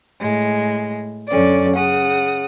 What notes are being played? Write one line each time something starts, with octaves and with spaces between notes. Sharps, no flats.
A2 G#3
F#2 D3 C#4 D5
C#3 F#5 D#6